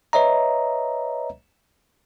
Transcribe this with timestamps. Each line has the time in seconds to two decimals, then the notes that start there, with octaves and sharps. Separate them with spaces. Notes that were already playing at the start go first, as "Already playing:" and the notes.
0.13 B4 C#5 D#5 E5 A#5